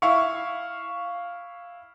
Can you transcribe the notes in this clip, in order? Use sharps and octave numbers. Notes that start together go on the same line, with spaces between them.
E4 F5 C#6